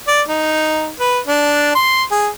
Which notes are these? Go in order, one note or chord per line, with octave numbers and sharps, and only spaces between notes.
D5
D#4
B4
D4
C6
G#4